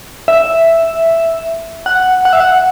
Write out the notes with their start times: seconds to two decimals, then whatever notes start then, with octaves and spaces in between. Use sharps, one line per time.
0.28 E5
1.86 F#5
2.25 F#5
2.33 E5
2.40 F#5